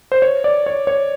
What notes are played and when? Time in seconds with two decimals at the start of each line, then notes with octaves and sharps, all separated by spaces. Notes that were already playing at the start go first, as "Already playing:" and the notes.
0.12 C5
0.22 C#5
0.44 D5
0.66 C#5
0.87 C#5